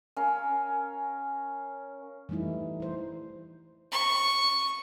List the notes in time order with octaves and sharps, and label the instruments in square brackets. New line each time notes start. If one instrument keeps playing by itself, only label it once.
[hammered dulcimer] C#4 A#4 F5
[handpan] E3 G3 A3 D#4 E4
E3 C5
[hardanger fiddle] C#6